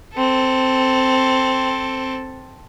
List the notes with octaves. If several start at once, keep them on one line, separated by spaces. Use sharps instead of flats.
C4 A4